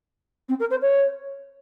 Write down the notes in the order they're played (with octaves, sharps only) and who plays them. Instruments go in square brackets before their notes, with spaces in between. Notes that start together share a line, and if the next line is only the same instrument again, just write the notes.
[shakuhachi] C4
A#4
C5
C#5